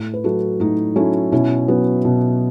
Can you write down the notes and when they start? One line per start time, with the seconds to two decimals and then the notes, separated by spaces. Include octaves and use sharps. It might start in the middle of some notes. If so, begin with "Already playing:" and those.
Already playing: A2
0.14 B4
0.24 F#3 A3 F#4 A4
0.60 A2 D#4 F#4
0.96 F#3 A3 C#4 E4
1.32 B2 C#4 E4
1.68 F#3 B3
2.05 B2